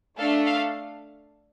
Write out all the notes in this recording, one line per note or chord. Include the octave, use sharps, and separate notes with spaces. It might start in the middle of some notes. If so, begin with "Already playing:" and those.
A3 D4 A4 F5
F5